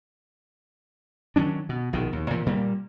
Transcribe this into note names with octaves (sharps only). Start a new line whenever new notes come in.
D#3 F#3 C#4 D4
B2
A#1 B2 D#3
D#2
A#2 E3 F3
A#2 G3 A#3